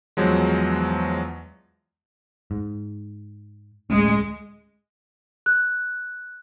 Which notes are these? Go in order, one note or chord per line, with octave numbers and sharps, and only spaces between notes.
E2 F3 F#3 G#3
G#2
D1 G#3 A3 C#4
F#6